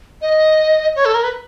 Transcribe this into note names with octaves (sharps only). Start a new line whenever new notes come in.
D#5
C#5
A4
A#4
B4